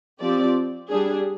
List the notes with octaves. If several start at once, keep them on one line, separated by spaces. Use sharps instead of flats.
F3 C4 G4 D5
G3 D4 G#4